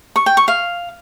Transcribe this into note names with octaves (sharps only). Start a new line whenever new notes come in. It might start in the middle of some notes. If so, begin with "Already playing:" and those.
C#6
G5
C#6
F5